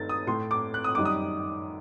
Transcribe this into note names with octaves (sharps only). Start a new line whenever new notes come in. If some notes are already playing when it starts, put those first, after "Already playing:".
Already playing: G2 D#3 A3 A6
D#6
A2 A3 C6
D6
F#6
D#6
F#2 D#3 G3 D6
D#6